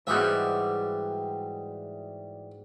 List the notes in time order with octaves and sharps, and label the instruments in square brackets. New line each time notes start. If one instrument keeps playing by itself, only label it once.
[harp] G#2 F#4 [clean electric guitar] E3 G3 [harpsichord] G#3 D#5 E5